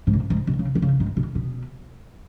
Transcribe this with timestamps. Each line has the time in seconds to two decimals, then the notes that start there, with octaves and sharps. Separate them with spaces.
0.07 G#2
0.13 B2
0.30 G#2
0.47 B2
0.59 C#3
0.75 D#3
0.82 C#3
1.00 G#2
1.17 B2
1.35 B2